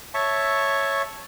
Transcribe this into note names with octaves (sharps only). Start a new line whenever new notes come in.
C#5 E5 A5 C#6